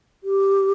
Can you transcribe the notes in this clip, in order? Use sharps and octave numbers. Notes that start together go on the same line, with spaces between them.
G4